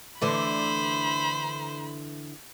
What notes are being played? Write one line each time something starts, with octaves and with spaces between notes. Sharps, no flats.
D3 E3 A3 C5 B5